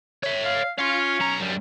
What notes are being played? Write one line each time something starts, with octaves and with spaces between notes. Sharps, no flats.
C#5 E5
F5
C#4 F4 F5
B1 A#5
F#2 G3